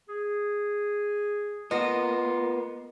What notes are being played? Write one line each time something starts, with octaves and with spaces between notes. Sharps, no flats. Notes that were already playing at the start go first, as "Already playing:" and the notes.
G#4
A#3 B3 F4 D#5